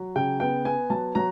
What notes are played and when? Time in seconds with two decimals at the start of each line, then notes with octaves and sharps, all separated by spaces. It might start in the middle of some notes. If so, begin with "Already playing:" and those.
Already playing: F#3
0.16 C#3 G5
0.40 B3 G5
0.65 B3 G#5
0.90 F#3 A5
1.15 F#3 A#5